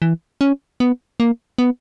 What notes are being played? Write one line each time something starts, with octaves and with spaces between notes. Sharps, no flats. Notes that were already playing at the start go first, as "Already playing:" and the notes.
E3
C#4
B3
A#3
B3